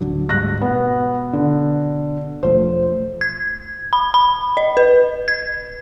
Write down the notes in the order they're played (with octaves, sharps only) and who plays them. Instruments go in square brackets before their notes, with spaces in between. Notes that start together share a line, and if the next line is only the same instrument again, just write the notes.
[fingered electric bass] D1 D3 F#3
[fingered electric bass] D2 G#2 G3 [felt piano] F#6 A#6
[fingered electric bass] B2 [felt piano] B3
[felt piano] D3
[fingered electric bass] E1 F3 A3 [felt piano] C5
[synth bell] G#6
B5
B5
D#5
B4
G#6